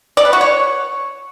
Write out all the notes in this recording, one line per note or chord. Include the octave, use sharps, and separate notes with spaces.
D5
B4
F#4
C#5